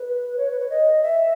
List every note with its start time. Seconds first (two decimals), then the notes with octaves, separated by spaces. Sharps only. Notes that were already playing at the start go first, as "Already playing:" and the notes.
Already playing: B4
0.37 C#5
0.50 B4
0.60 C#5
0.70 D#5
1.03 E5